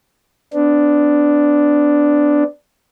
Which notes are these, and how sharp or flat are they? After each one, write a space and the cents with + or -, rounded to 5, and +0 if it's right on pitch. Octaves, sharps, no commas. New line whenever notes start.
B3 +35 D4 +0